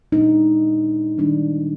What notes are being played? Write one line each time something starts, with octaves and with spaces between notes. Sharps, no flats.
A#2 G#3 D4 D#4
D#3 G3 D4